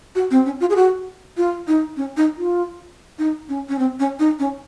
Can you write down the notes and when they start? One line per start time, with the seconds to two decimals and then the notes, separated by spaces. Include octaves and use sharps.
0.15 F#4
0.31 C4
0.46 C#4
0.60 F4
0.70 G#4
0.76 F#4
1.37 F4
1.68 D#4
1.97 C#4
2.17 D#4
2.37 F4
3.19 D#4
3.49 C#4
3.69 C#4
3.79 C4
4.00 C#4
4.19 D#4
4.39 C#4